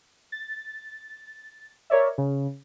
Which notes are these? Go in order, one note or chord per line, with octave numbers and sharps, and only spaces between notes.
A6
A#4 C#5 D5 E5
C#3